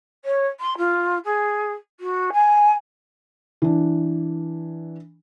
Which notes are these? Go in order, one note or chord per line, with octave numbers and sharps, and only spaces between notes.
C#5
C6
F4
G#4
F#4
G#5
E3 D4